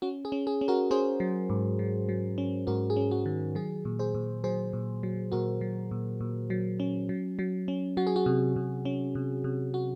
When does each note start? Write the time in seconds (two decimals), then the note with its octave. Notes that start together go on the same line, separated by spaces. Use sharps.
0.02 C#4 F#4
0.25 G#4
0.32 C#4
0.47 G#4
0.61 C#4
0.68 F#4 A#4
0.91 C#4 G#4 C5
1.20 F#3
1.50 G#2
1.79 F#3
2.09 F#3
2.38 C#4
2.67 G#2 F#4 A#4
2.90 G#4
2.96 C#4
3.11 F#4
3.26 D#3
3.55 F#3 G#4
3.85 A#2
3.99 G#4 C5
4.15 A#2
4.44 F#3 G#4 C5
4.73 A#2
5.03 F#3
5.32 A#2 F#4 A#4
5.61 F#3
5.91 A#2
6.21 A#2
6.50 F#3
6.80 C#4
7.09 F#3
7.39 F#3
7.68 C#4
7.97 F#3 F#4
8.07 G#4
8.16 F#4
8.26 C3
8.56 C3
8.85 C#4
9.15 C3
9.44 C3
9.74 F#4